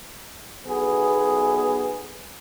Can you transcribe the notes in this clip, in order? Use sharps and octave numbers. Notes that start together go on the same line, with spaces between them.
B1 B3 G#4